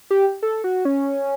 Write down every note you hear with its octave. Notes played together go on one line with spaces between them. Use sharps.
G4
A4
F#4
C#4